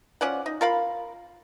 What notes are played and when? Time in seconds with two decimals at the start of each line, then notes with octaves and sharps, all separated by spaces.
0.21 F3 C#4 D5 F#5
0.46 D#4
0.61 F4 A#4 F5 B5